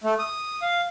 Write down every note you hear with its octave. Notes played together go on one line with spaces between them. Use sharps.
A3
D#6
F5